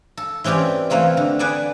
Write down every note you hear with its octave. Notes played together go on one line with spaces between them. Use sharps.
A4
E3 C4 C#4 G4 D5
E3 A3 A#3 C4 F4
D3
G#4 B4 D5 F#5 G#5 A5